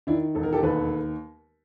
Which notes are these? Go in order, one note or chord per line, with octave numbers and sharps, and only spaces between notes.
D#3 D4 E4
E1 A4
A#4
G4 A4
D#2 A4 B4